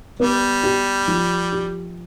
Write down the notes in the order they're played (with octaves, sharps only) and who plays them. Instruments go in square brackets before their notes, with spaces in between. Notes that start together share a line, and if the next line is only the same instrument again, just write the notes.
[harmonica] G3 [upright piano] B3
[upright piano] G4
F3
G4